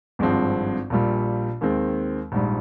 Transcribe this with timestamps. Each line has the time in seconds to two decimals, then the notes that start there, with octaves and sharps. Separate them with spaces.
0.19 G#1 G2 F3 G#3 C4
0.90 A#1 A#2 G3
1.61 D#2 D#3 G#3 C4
2.32 A#1 G#2 G3